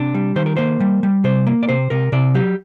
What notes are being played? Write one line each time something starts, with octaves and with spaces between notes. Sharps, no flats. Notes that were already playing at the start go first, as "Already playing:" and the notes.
Already playing: C3 D4
G3
D#3 C5
A#4
A#3 C5
G3
G3
C3 C5
A#3
D5
C3 C5
C3 A#4
C3 D5
F#3 G4